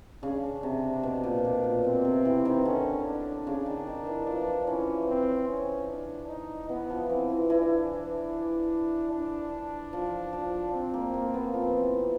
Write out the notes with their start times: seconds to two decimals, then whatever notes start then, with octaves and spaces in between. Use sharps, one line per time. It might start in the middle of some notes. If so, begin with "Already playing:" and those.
0.23 C#3 D4
0.63 C3
1.03 B2
1.24 A#2
1.45 B2
1.64 A#2
1.84 B2 C4
2.05 C3
2.25 E3
2.45 D#3
2.65 D3 C#4
3.05 D4
3.47 C#3
3.66 D#3
3.87 D#3
4.07 E3
4.26 F3 D4
4.67 E3 C#4
5.08 C4
5.48 C#4
5.88 D4
6.29 D#4
6.69 E3 B3
6.90 F3
7.09 E3 C4
7.30 E3
7.50 E3 D4
9.12 D4
9.93 F3
10.33 F3
10.73 C4
10.94 A#3
11.14 A#3
11.34 B3
11.54 F3 C4
11.80 E3